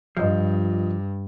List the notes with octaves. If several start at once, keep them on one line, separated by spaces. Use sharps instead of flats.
G2 F3 F4 D#5